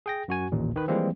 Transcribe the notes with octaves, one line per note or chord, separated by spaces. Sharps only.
G#4 G5 A#6
F#2 F#4 G#5
A1 D#2 A#2
D#3 B4
E3 F3 G3 G#3 A#3 C4